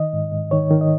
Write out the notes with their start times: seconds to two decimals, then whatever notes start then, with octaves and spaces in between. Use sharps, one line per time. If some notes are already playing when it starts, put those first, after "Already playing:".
Already playing: D#3 D#5
0.13 G#2
0.32 G#2
0.51 D#3 C#5
0.71 D#3
0.81 D#5